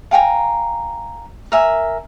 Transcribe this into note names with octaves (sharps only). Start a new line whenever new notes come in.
F5 G5 G#5 A#5
A#4 E5 G#5